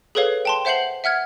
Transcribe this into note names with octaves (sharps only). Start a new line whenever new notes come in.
G#4 A4 B4 C#5 F5
G5 A5 C6
C5 E5 F#5 G6 C7 F#7
E5 F#5 F6 G#6